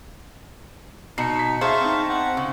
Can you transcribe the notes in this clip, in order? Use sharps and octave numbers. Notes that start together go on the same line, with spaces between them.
B2 D#4 C7 C#7
B6
G#4 C5 E5 F5 A5 C#6
C4 D#4
F#5
C#3